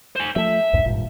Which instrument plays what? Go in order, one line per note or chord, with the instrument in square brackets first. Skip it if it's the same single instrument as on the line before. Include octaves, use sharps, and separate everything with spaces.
[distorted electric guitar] C5 G#5
[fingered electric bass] F3 A3 [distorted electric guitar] E5
[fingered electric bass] B1 E2 G#2
G#1 G2 A#2